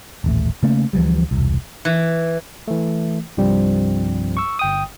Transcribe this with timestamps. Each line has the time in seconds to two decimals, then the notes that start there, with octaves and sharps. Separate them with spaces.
0.24 D#1 A1 A3
0.63 C#3 A3 A#3 C#4
0.93 D2 E3 F3 G3
1.31 E1 C2
1.85 E3
2.68 E3 A3
3.37 C2 G2 F3 G3 C4
4.37 C#6 E6
4.59 G1 G5 D#6